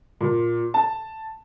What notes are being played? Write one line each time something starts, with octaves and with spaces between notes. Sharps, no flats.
A#2
A5